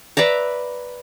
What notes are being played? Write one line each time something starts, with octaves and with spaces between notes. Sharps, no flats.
B4 D5 E5 A#5